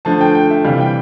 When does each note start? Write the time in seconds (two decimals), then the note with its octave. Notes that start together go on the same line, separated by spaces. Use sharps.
0.05 D3 F3 A3 A5
0.21 G5
0.35 G5
0.50 E5
0.64 C3 E3 G3 F5
0.80 G5